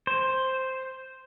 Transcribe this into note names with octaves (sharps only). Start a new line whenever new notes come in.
C5